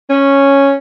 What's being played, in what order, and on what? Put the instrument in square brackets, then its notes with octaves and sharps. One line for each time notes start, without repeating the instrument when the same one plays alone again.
[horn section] C#4